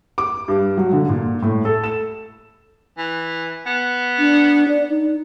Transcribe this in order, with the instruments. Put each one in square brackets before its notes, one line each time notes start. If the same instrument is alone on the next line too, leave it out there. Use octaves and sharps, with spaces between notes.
[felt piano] D6
G2
F#3
D3
A#2
A2
A4
E7
[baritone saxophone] E3
B3
[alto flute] D4
D5
D#4